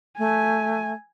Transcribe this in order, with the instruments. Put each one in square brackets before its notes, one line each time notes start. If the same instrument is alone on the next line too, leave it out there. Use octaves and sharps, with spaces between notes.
[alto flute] A3 [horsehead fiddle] G#5